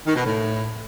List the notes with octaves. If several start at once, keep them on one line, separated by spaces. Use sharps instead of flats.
D#3
B2
A2